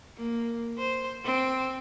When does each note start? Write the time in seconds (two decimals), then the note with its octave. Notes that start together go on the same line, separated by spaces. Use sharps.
0.17 A#3
0.78 C5
1.25 C4